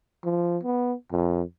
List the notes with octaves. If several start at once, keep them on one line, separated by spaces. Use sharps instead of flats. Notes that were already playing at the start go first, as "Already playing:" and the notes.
F3
B3
F2